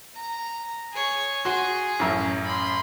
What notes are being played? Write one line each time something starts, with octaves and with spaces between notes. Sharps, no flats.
A#5
G#4 C#5
F#4 G#4 C6
A1 F#2 E5
B5 C6